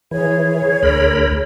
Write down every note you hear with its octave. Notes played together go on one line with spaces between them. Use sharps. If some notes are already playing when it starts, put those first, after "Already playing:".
E3 G#4 C#5 G#6
D2 A#4 B5